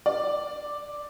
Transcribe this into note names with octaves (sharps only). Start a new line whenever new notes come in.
D5